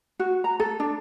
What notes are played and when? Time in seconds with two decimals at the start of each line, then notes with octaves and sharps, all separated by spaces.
0.19 F#4
0.44 A#5
0.60 A4
0.80 D4